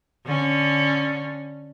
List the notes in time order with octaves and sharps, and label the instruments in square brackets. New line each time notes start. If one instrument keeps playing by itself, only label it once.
[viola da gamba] D3 C#4